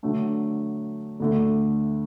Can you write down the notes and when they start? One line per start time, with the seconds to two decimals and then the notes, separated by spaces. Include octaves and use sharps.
0.03 D3 F#3 A3 D4
1.20 D2 D3 A3